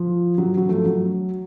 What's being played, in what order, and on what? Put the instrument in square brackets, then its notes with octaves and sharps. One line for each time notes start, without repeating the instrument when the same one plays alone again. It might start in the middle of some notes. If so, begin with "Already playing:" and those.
Already playing: [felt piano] F3
F#3
F#3
F3 A3
F#3